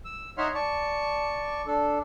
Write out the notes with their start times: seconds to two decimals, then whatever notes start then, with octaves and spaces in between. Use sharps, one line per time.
0.05 E6
0.38 D#4 C#5 E5 F#5 C6 F6
0.55 D5 A5 C#6
1.66 D4 A4